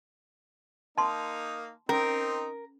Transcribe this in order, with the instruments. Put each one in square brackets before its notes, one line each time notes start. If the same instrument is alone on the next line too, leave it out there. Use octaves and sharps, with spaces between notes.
[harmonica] A#3 D#4 [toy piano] A5 C6
[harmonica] C4 D#4 [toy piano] C#4 [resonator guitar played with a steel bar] A#4